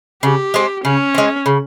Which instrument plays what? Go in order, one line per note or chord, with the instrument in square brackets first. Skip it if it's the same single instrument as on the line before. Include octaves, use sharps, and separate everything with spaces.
[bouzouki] C#3 [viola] G4
[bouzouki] G#3 C4
[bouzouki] C#3 [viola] C#4
[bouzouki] G#3 C4
C#3